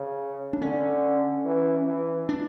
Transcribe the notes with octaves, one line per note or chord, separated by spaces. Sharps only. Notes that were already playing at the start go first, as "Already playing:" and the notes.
Already playing: C#3
D4
D3 C#4
E3
E3
D4